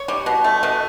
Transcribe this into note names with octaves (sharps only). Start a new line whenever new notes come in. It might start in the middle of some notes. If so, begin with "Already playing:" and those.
Already playing: C#5
G3
B2
A3
B2